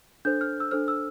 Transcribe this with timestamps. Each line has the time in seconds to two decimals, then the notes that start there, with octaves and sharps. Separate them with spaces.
0.25 D4 A4 C5 G6
0.41 F6
0.60 E6
0.71 D4 A4 C5 F6
0.88 E6